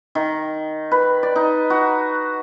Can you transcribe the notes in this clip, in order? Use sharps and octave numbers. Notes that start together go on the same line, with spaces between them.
D#3
B4
D5
D#4
F#4